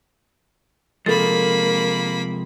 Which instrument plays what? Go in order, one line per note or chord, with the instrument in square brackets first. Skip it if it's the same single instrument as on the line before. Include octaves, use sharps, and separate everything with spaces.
[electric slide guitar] C3 F3 G#3 [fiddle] A#3 B5 [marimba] A4 [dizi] A#4